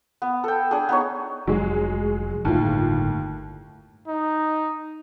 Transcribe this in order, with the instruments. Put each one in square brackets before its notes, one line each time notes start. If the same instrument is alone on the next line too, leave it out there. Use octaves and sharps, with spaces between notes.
[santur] B3
A4 G5
D4 G#4
B3 D#4 C#5
[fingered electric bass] F1 [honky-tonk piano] F#3 G#3
[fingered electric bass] G1 A2 [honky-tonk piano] D#2 F4
[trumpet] D#4